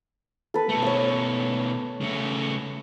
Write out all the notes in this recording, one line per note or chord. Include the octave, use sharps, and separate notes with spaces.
A4 B4
B2 A3
C#5 E6
C#3 A3